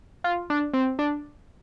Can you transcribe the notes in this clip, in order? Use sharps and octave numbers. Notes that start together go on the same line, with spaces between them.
F4
D4
C4
D4